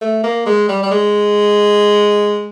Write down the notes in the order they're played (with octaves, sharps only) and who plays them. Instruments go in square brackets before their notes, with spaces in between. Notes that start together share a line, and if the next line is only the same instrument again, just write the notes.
[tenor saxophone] A3
A#3
G#3
G3
G3
G#3